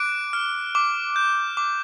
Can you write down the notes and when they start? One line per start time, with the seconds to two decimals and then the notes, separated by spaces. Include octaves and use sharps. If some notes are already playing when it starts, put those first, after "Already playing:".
Already playing: D6 F#6 D7
0.33 F6
0.75 D6
1.16 G6
1.57 D6